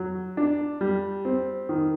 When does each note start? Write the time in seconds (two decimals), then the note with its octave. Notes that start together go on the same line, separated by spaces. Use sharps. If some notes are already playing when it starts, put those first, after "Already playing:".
Already playing: F#3
0.37 D4
0.81 G3
1.25 C4
1.69 D#3